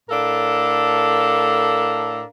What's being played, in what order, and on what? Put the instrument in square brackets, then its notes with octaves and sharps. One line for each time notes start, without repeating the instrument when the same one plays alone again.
[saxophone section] A2 D4 A4 A#4 F5